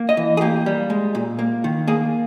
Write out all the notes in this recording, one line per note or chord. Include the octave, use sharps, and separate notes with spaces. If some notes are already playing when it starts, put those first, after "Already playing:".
Already playing: A#3
D#5
E3
G#4
A#3 G4
G3
G#3
A#2
A#3
D#3
A#3 G#4